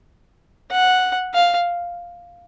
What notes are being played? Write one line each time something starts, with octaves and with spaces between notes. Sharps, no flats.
F#5
F5